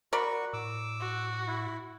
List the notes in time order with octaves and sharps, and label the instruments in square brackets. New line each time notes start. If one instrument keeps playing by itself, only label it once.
[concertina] F#4 C#6 [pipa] A#4 D5 B5
[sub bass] A2 [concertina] D6 E6
[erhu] F#4
[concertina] E4